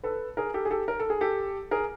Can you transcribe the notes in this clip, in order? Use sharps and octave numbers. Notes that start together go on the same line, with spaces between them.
A4 B4
G#4 A#4
G4 A4
G#4
G4 A4
A#4
A4
G#4
G4 A4
G#4 A#4